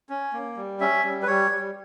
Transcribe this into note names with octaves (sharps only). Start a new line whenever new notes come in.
C#4
A#3
G3
C#4 E5
G3
B4
G3 C#5
G3